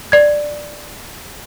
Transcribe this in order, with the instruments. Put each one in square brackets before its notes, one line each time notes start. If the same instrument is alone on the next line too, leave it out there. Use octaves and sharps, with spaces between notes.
[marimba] D5 G#6